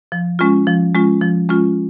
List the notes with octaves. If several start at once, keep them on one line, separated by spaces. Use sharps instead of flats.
F3
G#3 C#4 F4
F3
G#3 C#4 F4
F3
G#3 C#4 F4